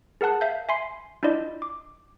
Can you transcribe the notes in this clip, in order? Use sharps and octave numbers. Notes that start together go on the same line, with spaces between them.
G#4 A#4 F#5 A5 F#6
E5 F5 G6
E5 G#5 B5 C6 C7
D4 E4 F4 D5 D#5
D6